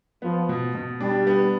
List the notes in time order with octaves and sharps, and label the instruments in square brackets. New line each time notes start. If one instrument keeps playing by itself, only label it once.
[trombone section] F3 [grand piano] B3
[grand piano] B2
B2
[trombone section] G3 [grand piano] D4
[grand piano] B3